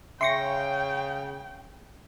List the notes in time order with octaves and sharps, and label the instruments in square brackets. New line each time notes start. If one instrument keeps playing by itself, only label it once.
[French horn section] C#3 [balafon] E5 [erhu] G5 [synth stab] C6 C#6 A#6